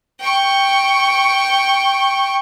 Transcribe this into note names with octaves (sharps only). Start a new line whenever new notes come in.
G5 C#6